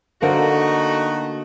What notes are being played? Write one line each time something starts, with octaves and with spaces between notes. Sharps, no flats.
D3 A3 A#3 D#4 F#4 C5